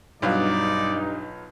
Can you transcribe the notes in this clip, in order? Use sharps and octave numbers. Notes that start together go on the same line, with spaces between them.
B1 G2 F#3 D#4 F4 D5